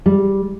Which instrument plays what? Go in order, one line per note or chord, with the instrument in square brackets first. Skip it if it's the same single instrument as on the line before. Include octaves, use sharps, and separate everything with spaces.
[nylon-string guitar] G3